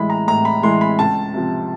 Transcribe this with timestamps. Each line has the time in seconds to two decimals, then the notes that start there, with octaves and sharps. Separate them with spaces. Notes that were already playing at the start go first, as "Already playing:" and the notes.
Already playing: A2 E3 G#3 B5
0.10 A#5
0.27 A2 A#5
0.45 B5
0.63 E3 G#3 C6
0.81 B5
0.99 C#2 A5
1.34 C3 F3